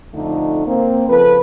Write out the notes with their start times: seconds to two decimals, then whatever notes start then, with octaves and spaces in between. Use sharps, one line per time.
0.14 F2 D3 A3 D#4
0.67 A#3 C4
1.08 C#3 F3 A4 B4